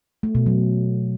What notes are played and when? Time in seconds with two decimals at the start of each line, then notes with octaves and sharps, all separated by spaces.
0.23 A3
0.35 B2
0.46 F#3